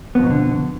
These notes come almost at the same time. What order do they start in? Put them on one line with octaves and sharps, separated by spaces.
B3 F2 B2 D#3 D3